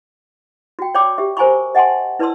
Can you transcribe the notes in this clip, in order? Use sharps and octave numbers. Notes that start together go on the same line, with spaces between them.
F#4 G5
C#5 D5 G5 B5 D6
G4 E5
A#4 C5 G#5 A#5 B5 C#6
D#5 F#5 G#5 A5 C6
E4 B4 D5 A5 C6 E6